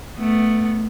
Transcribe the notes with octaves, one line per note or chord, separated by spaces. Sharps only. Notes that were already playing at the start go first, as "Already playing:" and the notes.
A3 B3